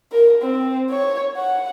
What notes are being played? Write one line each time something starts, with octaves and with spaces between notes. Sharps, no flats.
A#4
C4
C#5
F#5